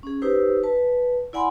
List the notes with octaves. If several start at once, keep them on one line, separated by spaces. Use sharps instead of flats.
C#4 G#4
D#4 G4 B4 C5 E6
B4 A5
E4 D5 F#5 G#5 B5 C6